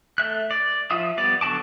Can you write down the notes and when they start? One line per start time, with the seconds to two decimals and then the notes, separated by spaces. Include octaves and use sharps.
0.18 A3 E5 F#6
0.51 D5
0.91 F3 F4 E5 F5 D#6
1.17 G3 B3 D5
1.41 D3 F#3 F#4 A5 D6